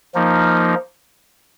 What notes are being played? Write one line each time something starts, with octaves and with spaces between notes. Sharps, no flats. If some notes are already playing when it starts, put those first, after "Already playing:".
F3 A#3 D#4